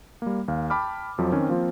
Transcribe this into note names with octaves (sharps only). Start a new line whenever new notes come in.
G3 A#3
D#2 F5
G5 A5 B5 D6 F6
F2 F3 F#3
D#3 C4 C#4
F3 A#3 C4 F4